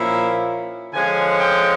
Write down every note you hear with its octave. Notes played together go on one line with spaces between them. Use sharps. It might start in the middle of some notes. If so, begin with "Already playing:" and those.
Already playing: A#2 F3 A#3 C#4 E4 E5
D3 F3 G#3 C#4 G#5
G5